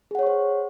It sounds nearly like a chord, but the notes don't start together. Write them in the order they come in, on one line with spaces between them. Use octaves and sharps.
G#4 F#5 C#5 C#6 C5